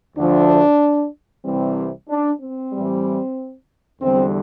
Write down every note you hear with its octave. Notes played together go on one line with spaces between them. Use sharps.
D2 D3 F3 D4
C2 C3 E3 G3 C4
D4
C4
A2 E3 G3
E2 D3 G3 C4